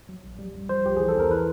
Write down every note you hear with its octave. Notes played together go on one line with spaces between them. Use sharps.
F#3
A#1
G3
F#2
F3 C5
C2 G4
E3 G#4
A4
E2 A#4
E3 B4